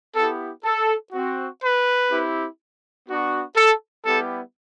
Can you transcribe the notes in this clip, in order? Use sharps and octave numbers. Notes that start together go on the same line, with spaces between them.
B3 E4 G4 A4
A4
C4 F#4
B4
C4 E4 G4
B3 D4 F#4
A4
G3 B3 E4 G4 A4